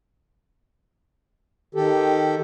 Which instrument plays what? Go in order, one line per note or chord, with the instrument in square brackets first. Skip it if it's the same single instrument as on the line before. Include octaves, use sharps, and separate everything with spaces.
[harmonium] D#3 G4 A4